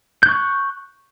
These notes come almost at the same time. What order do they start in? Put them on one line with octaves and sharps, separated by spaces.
G6 F#6 C#6